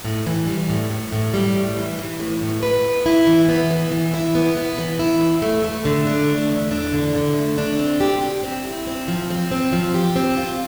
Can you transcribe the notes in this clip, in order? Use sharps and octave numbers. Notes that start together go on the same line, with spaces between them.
A2
E3
G3
A2
A2
A2
G3
A2
E3
E3
A2
A2
B4
B3
E4
E3
B3
E3
E3
E4
B3
B3
E3
E4
E2
A3
A3
D3
D4
A3
E2
D4
D3
D3
A3
D4
C4
G4
G4
C4
E4
C4
F3
C4
C4
F3
G4
C4
F4